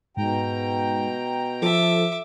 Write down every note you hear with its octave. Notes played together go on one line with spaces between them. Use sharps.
G#2 B2 G5 A#5
F3 A4 E5 D6